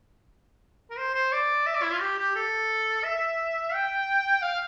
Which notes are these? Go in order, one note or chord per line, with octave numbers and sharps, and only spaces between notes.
A#4
C5
C5
D5
E5
D5
E4
F4
G4
G4
A4
E5
G5
F5